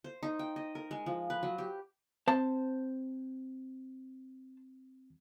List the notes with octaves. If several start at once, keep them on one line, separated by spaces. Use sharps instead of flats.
C5
D#4
G5
D#5
A#4
G#3
F3
B4
F#3
G4
C4 C5 A5